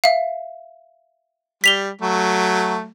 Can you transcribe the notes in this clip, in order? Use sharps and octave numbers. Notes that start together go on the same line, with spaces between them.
E5 F5
G3 B6 F7 G7
F#3 A3